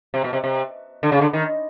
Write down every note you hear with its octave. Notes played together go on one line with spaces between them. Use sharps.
C3
B2
C3
C3
D3
C#3
D3
D#3